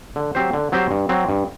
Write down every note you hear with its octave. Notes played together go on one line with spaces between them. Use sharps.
D3
F#3 C4 G4 C5
D3
F#3 C4 G4 C5
G2
F#3 C4
G2